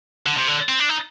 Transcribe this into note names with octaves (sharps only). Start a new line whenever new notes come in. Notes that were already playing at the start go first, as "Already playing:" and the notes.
D3
C3
D3
C4
D4
D#4